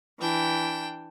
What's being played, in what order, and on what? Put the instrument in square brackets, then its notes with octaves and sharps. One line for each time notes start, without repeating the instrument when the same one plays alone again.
[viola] E3 [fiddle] D4 G5